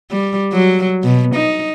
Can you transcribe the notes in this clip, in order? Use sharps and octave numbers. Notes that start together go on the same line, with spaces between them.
G3
F#3
B2
D#4